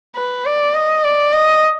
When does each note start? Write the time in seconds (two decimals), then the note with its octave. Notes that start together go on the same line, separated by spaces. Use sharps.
0.16 B4
0.46 D5
0.75 D#5
1.04 D5
1.33 D#5